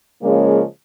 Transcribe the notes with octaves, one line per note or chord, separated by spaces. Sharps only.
C#3 F3 G#3 A#3 C#4